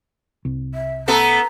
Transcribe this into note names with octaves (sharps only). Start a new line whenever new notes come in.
C2
E5
A3 B3 A4 A#5